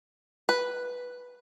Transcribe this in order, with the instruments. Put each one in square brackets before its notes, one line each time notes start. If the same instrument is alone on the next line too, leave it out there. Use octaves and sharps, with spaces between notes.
[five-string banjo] B4